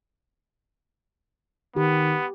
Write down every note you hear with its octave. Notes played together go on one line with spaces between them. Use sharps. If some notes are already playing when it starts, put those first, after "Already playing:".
D#3 B3 G4